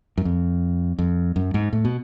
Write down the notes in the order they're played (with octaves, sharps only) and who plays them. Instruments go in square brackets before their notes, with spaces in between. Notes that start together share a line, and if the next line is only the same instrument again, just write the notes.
[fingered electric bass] F#2
F2
F2
F#2
G#2
A2
B2